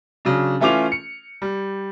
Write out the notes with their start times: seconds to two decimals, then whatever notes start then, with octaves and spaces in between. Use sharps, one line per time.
0.25 C#3 F#3 D4
0.60 E3 A3 C#4 F4 D6 F7
0.92 C#7
1.42 G3